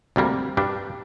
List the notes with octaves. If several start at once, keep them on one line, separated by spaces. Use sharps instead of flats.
D2 C3 G3 A#3
G2 G3 D4